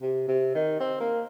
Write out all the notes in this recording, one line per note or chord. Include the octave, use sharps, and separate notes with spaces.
C3
C3
D#3
C4
A#3